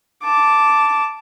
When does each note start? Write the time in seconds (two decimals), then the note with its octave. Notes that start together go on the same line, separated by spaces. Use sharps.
0.24 A5 D6